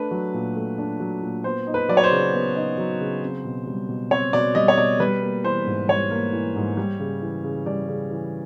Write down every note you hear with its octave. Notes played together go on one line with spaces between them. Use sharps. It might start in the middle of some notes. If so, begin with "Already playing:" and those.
Already playing: A3 D4 B4
F#3
A#2
A3
D4
F#3
A#2
B3 C5
D#4
B4
F#3 D5
C#5
C5
C#3
B3
D#4
F#3
C#3
C4
B2
G3
B2
C4 C#5
B2 D5
G3 D#5
C#5
B2 D5
G3 B4
A#3
E3 C5
G#2
G3 C#5
A#3
E3
G#2
G3
C#3
E3
C#3
G3 D5
C#3
E3